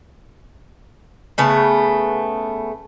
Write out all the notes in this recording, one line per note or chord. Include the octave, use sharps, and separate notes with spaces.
C#3 A3 B3